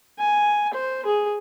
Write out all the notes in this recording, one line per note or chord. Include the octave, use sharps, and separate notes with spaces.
G#5
C5
G#4